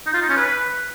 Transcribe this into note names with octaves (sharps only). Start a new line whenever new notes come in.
D#4
F4
D#4
C#4
B4